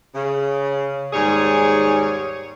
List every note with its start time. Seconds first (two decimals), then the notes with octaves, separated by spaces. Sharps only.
0.15 C#3
1.13 D#2 G#2 G3 G#4 C#5